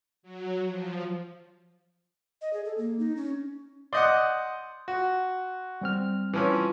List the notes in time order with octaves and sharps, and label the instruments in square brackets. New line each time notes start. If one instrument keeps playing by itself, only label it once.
[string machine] F#3
F3
[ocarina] D#5
G#4
A4
A#3
D#4
C#4
[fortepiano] D5 D#5 F#5 [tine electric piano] C6 D#6 G6
[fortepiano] F#4
[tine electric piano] G3 C4 F6
[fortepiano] E3 F3 C#4